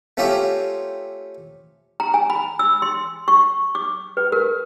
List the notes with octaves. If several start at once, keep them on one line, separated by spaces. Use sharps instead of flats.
A3 C4 C#4 F4 G4 E5
A#5
G#5
B5
E6
C6
C#6
D6
B4
A#4